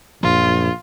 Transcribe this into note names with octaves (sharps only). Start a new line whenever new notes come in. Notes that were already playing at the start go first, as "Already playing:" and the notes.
A#1 F#2 A#2 F3 F4